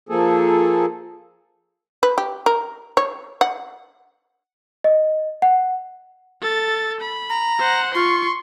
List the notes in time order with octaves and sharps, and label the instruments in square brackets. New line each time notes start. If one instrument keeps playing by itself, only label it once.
[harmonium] F3 A#3 G#4 A4
[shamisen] B4
G4
A#4
C#5
F#5
[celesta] D#5
F#5
[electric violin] A4 A6
B5
[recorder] A#5
[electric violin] C5 F#5
[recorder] F4 [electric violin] C6 C#6